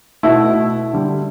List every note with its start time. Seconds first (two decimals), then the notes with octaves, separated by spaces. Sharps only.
0.23 B2 A3 E4
0.93 D3 G3